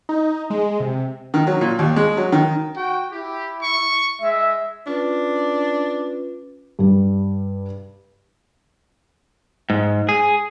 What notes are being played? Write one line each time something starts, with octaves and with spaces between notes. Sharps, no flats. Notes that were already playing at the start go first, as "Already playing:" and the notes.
D#4
G#3
C3
D#3
F#3
A#2
D#2
G#3
F#3
D#3
F#4 G5
E4 G4
C#6
G#3 E5
C#4 D4 F4 B4
G2 G3
G#2
G#4